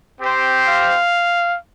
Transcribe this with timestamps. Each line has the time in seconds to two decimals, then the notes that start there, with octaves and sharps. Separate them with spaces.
0.20 C4 G4 C5
0.68 F5